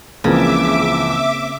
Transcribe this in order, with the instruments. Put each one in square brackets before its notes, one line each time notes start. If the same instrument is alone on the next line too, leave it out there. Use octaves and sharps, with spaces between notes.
[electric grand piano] C#2 E3 F3 [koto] C#3 [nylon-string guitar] A#3 C4 [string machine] E5 D6